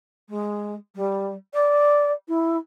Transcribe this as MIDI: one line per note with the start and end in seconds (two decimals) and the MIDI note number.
0.29 0.75 56
0.95 1.34 55
1.54 2.11 74
2.28 2.57 64